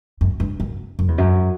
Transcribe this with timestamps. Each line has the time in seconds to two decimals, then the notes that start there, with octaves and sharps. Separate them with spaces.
0.21 F#2
0.40 G2
0.60 F#2
0.99 F#2
1.08 E2
1.18 F#2